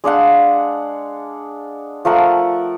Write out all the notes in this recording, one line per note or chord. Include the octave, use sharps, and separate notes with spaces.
G#3 D4 F5 F#5
F3 A3 A#4 F#5